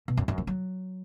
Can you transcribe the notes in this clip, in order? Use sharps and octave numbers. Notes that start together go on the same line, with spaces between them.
B2
F#2
F#2
F3
F#3